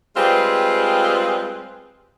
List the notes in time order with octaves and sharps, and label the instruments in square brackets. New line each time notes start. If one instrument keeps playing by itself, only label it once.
[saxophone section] G3 G#3 C4 F4 G#4 B4